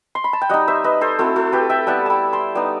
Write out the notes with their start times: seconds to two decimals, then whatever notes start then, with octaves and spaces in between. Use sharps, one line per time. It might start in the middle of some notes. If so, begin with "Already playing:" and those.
0.15 C6
0.24 B5
0.33 A5
0.41 G5
0.49 G3 D#4 D#5 F#5
0.68 C5 E5
0.84 B4 D#5
1.01 A4 C5
1.19 A3 C4 E4 F#4 A4
1.36 F#4 A4
1.52 G4 B4
1.69 E5 G5
1.87 G3 B3 E4 F#5 A5
2.06 G5 A5 B5
2.33 A5 C6
2.55 G3 B3 D#4